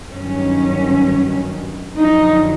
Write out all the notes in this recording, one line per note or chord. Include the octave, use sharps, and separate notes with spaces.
G2 D#3 F#3 C#4
F2 D3 F#3 D#4